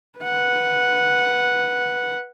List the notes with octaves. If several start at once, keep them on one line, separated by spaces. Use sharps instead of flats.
B4 F#5